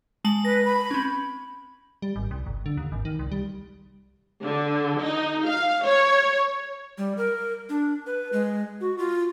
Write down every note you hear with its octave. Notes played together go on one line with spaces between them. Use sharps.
G#3 A5 F#7
B4 A#6
B5
C4 C#4
G3
G#1
C2
G1
D3
D#2
G#1
D#3
C2
G3
D3
D#4
F5
C#5
G3
A#4
D4
B4
G#3
F#4
F4